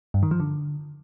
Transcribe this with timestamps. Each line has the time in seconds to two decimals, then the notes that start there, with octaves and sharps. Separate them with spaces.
0.14 G2
0.23 D#3
0.31 F3
0.40 D3